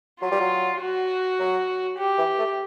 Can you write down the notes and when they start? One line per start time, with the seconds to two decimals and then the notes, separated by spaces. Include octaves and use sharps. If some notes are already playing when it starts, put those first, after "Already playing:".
0.21 F#3 F4
0.31 G3
0.40 F#3
0.80 F#4
1.39 F#3
1.98 G4
2.18 E3
2.38 A3